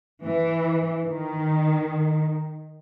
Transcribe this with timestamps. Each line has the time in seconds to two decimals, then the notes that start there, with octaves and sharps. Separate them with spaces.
0.24 E3
1.08 D#3